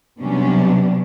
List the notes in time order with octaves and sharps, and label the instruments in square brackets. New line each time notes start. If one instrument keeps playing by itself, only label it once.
[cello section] C3 F#3 G3 B3 C#4 D4